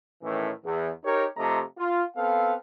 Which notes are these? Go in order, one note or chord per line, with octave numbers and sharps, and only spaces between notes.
A2 D#3 E3 A3 C#4
E2
D#4 G4 A#4 C#5
C3 F3 A3 D#5 A#5
F4
B3 C4 A4 F5